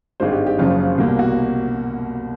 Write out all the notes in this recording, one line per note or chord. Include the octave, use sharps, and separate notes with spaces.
G#1 G2 D#3 G#3 C5
G4
G4
F#1 F#2 C#3 F3 F4
C2 B2 G3 A#3
F#4